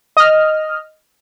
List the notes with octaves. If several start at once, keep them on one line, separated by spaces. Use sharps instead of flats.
D#5 F6